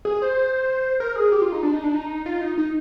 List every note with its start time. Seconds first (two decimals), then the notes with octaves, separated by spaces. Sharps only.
0.05 G#4
0.22 C5
1.00 A#4
1.16 G#4
1.32 G4
1.42 F4
1.52 D#4
1.63 D4
1.73 D#4
1.84 D4
1.94 D#4
2.26 F4
2.41 D#4
2.58 D#4